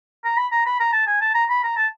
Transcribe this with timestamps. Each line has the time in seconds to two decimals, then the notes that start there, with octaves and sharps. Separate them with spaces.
0.25 A#5
0.37 B5
0.52 A#5
0.66 B5
0.80 A#5
0.93 A5
1.07 G#5
1.21 A5
1.35 A#5
1.50 B5
1.64 A#5
1.77 A5